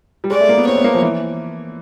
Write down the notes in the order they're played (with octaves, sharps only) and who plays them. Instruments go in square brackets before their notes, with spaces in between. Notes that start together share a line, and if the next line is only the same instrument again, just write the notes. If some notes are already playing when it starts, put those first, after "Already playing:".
[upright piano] G3
[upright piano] G#3 [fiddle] D5
[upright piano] A3
A#3
B3
[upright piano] C4 [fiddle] C#5
[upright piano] B3
A#3
F3
E3